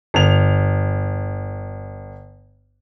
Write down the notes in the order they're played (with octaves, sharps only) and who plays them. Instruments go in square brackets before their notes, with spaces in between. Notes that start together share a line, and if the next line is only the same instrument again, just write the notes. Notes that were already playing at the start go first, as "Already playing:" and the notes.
[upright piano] G1 F7